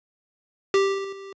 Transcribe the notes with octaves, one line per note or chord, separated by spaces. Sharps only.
G4